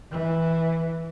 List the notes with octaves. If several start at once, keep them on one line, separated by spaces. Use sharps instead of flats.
E3